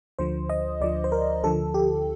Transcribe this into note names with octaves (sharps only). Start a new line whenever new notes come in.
D2 D3 F3 C5
D#5
D2 D3 F3 D5
C5
A#4
D2 D3 F3 A4
G4